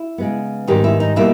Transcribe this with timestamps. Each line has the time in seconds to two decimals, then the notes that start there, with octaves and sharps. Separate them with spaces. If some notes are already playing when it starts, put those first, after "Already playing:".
Already playing: E4
0.18 C#3 G#3 B3
0.68 G#2 D#3 G3 B3 G4
0.84 E4
1.00 D#4
1.16 B2 G3 A#3 E4